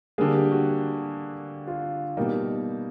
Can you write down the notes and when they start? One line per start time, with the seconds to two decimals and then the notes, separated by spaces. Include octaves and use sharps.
0.18 D3 G3 A#3 G#4
0.35 G4
0.52 F#4
1.67 F4
2.17 B2 G3 A#3 D#4